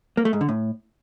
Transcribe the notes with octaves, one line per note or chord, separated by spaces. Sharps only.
A#3
A3
G#2
D3
A2